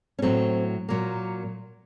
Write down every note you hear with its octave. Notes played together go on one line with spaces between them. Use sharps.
C#4
A2 F#3 A3 C4
A#2 F#3 A#3